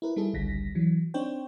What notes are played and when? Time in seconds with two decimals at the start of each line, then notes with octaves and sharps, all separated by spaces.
0.02 E4 A#4 B4
0.16 G3 D#4 E4 G#4 A4
0.34 G#1 C#2 D3 G3 A#6 B6
0.75 E3 F#3
1.14 C4 D4 D#4 C5 C#5 G5